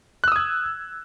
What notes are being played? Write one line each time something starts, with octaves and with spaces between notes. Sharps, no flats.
D#6 E6 F#6 G#6